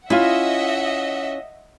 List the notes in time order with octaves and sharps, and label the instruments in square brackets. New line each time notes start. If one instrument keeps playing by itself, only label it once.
[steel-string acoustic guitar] C#4 [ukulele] E4 F4 [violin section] D#5 E5 F#5